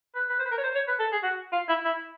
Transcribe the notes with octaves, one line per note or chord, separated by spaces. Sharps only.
B4
B4
C5
B4
A#4
C#5
C5
C#5
B4
A4
G#4
F#4
F4
E4
E4